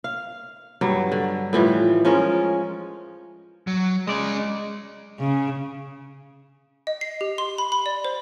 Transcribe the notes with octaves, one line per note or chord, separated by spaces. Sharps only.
F5
G2 F#3 G3
D3
A2 E3 F3 G3
F3 G#3 C#4 A#4
F#3
G#3 C#4 D5 D#5
C#3
D#5
C7
G4
C6
B5
B5
D5
C5